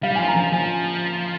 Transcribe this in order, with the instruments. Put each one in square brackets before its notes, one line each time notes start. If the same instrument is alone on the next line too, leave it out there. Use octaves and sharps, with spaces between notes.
[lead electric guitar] G3 [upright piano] F5
[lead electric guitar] F3 [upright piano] G#5
[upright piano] A#5
[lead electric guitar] F3 [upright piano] G#5
[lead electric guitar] F3 [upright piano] G#5